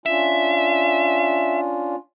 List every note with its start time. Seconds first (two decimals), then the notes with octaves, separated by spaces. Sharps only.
0.06 C#4 D4 F4 E5